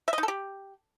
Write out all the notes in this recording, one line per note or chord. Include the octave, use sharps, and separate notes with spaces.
E5
D#5
D#4
A4
G4